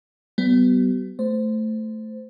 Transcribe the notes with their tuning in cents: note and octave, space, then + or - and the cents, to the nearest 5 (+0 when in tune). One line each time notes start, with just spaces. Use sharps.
G3 -45 B3 +10
A3 +0 C5 -15